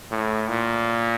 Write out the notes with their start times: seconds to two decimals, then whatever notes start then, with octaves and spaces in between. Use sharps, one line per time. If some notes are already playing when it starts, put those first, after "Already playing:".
0.11 A2
0.49 A#2